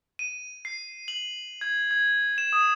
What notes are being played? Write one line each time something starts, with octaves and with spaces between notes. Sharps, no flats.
D#7
C7
F#7
G#6
G#6
E7
D#6